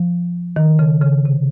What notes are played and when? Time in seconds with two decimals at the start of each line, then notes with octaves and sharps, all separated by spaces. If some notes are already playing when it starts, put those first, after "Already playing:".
Already playing: F3
0.56 D#3
0.79 C#3
1.02 C#3
1.25 C3